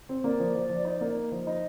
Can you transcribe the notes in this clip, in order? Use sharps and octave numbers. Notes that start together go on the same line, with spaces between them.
C4
A#3 D5
F3
F3
F3
D#4
A#3
D#4
F3
D#4 D#5